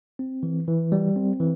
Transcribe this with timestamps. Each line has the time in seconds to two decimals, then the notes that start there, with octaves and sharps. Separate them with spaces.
0.19 C4
0.43 E3
0.68 E3
0.92 G3
1.16 C4
1.40 E3